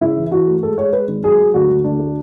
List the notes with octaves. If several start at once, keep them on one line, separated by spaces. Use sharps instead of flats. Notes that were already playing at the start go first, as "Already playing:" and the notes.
C#3 E4
E3
E3 F#4
A3
G#3 A4
G#3 C#5
G#3 B4
G#1
F#3 G#4
F#3
D2 F#4
D2
D2 D4
A3